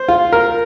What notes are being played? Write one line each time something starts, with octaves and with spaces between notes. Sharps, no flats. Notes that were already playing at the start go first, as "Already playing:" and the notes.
Already playing: C5
F4
A#4